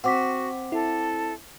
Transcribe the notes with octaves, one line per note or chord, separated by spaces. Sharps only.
C4 F#4 F#5 D6 B6
E4 A4